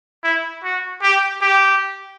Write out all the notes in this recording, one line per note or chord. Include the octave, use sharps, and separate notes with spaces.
E4
F#4
G4
G4